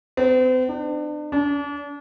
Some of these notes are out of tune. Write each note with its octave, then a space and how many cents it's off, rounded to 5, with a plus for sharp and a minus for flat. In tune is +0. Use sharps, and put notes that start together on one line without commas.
C4 -40
D4 +35
D4 -35